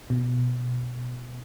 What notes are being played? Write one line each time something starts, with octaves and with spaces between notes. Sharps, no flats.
B2